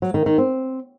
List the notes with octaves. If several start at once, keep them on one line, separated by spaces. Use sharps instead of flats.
F#3
D#3
D#3
C4